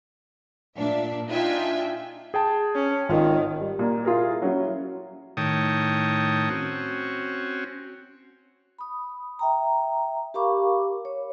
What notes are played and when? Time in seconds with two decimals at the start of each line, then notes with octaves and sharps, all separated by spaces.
0.77 A#2 D4 E5
1.29 D4 D#4 F4 E5 G5 G#5
2.34 G#4 G5 A5
2.75 C#4
3.09 G#1 D#3 F4
3.60 G3
3.79 A#2 A#3
4.05 E4 F4 G#4 A#4
4.42 F#3 C#4 E4
5.37 A2 D#3 C#5 G5 A5 D#6
6.50 C4 C#4 F#4
8.79 B5 D#6
9.39 E5 G5 A#5
10.34 G4 A#4 F5 B5 C#6 D6
11.05 C#5